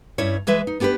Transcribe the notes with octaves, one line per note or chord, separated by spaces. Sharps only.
G2 C#4 E4 C#5
E3 G#3 B4 E5
D#4
B3 D4 G4 A#4 B4